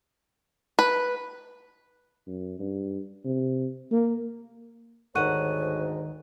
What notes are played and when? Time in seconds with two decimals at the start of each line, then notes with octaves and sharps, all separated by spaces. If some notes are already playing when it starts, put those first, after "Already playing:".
0.79 B4
2.27 F#2
2.59 G2
3.25 C3
3.91 A#3
5.15 D2 G#2 D#3 C#5 F#5 C#6 F#6 D#7